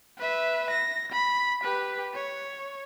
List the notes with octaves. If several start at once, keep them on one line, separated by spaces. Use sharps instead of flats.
B4 E5
A#6
B5
G4 B4
C#5